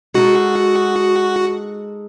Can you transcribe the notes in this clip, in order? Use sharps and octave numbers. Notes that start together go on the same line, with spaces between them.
G#3 D#4 F#4 A4